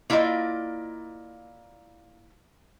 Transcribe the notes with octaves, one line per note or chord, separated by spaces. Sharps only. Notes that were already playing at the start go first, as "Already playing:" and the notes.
A#3 E4 F4 D5 D#5